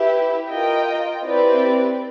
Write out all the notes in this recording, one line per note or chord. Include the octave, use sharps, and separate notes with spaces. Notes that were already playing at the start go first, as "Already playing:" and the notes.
Already playing: E4 G4 B4 E5
F4 A#4 D#5 G5
C4 E4 G4 B4 D5